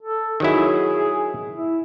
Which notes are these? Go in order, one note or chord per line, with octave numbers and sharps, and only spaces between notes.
A4
D#3 F#3 E4 G#4
E4